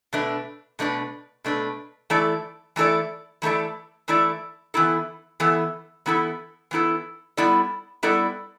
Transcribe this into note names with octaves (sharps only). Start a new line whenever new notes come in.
B2 A3 D4 B4
B2 A3 D4 B4
B2 A3 D4 B4
E3 A3 E4 A4 D5
E3 A3 E4 A4 D5
E3 A3 E4 A4 D5
E3 A3 E4 A4 D5
E3 B3 E4 A4
E3 B3 E4 A4
E3 B3 E4 A4
E3 B3 E4 A4
G3 B3 E4 A4 D5
G3 B3 E4 A4 D5